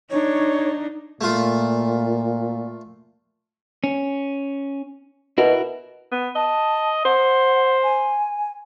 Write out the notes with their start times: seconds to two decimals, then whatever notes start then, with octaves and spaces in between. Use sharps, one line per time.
0.10 D4 D#4 C#5
1.21 A#2 A3 F4
3.84 C#4
5.38 B2 E4 F#4 A#4
6.12 B3
6.36 D#5 A5
7.05 C5 F#5
7.84 G#5